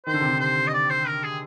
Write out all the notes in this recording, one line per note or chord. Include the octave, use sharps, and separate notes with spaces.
D#3 C5
D3
C3
D3
C5
D#5
D5
C5
A#4
G#4